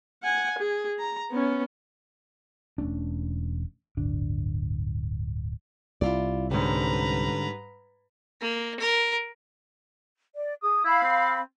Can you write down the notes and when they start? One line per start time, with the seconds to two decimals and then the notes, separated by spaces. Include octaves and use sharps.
0.23 F#5 G#5
0.59 G#4
0.99 A#5
1.31 B3 C#4
2.78 E1 A3 C#4 D4
3.97 D1 G1 D4
6.01 C2 E4 F4 D5
6.51 G#2 D3 G3 C#4 G4 B4 A#5
8.41 A#3
8.80 A#4
10.35 D5
10.63 G#4 D#6
10.85 E4 F5 B5
11.03 C4